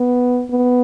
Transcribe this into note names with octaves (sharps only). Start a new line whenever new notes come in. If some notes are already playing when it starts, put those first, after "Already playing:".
Already playing: B3
B3